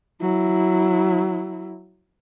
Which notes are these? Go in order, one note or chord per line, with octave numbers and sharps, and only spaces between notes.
F#3 E4